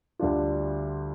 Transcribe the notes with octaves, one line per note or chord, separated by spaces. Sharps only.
D2 D3 G3 D4 F4